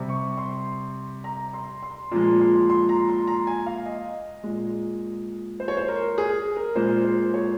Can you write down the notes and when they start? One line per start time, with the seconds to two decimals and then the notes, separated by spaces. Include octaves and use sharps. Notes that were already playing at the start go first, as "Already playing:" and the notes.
Already playing: C3 G3
0.09 C#6
0.38 C6
1.24 A#5
1.53 C6
1.83 C6
2.11 A#2 F3 G#3 C6
2.41 C6
2.70 C6
2.89 A#5
3.08 C6
3.27 A#5
3.47 G#5
3.66 F5
3.85 D#5
4.44 A#2 G#3
5.60 C5
5.68 C#5
5.77 C5
5.88 A#4
6.18 G#4
6.56 A#4
6.75 A#2 G#3 C5
7.04 C5
7.34 C#5